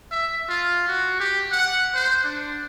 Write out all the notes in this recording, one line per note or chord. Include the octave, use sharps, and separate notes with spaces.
E5
F4
F#4
G4
F#5
C5
D4